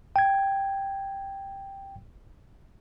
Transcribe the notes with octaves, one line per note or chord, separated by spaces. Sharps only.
G5 G#6